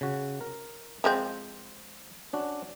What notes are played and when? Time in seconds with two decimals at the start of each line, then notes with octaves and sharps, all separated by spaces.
0.01 C#3 F#4
0.41 A#4
1.04 F3 G#3 C4 C5
2.33 C#4 D4 F#4